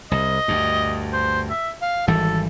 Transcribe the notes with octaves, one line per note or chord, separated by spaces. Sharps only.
C2 D#5
D2 G2
C5
E5
F5
G#1 E3 G3 A4